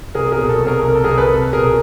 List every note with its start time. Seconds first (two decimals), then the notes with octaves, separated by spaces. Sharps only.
0.15 C2 G#4 A#4
0.32 G#4 A#4
0.38 B2
0.49 A4
0.60 C2
0.66 G#4 A#4
0.84 C2 A#4
0.95 A4
1.04 C2 G#4 A#4
1.18 A4 B4
1.30 C2
1.53 B2 G#4 A#4